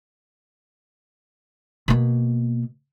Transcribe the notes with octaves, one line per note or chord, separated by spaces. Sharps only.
B2 A#3